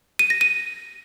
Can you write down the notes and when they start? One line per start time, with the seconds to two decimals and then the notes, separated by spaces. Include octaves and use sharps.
0.19 D#7
0.30 A#6
0.41 D#7